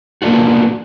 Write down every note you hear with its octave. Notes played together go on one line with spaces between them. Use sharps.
A#3 B3 D4 F4 F#4